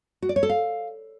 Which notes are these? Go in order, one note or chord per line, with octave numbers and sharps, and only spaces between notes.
F#4
D5
C#5
A4
F5